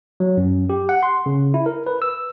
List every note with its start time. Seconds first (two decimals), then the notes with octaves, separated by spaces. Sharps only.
0.20 F#3
0.37 F#2
0.70 G4
0.89 F#5
1.03 C6
1.26 C#3
1.54 E4
1.66 A#4
1.87 B4
2.02 E6